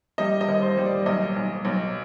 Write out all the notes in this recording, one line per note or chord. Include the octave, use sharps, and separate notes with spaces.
G3 D#5
D#5
D#2
C5
G3
D5
B1 D#5
B1
B1